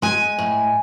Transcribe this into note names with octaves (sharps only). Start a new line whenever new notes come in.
G#3 G#5
A2